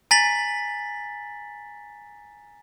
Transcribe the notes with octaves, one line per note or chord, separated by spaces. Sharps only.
G#5 A#5 A6 B6 F#7